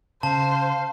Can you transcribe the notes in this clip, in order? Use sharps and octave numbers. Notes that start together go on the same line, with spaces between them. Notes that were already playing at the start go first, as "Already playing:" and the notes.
C#3 C5 F5 A5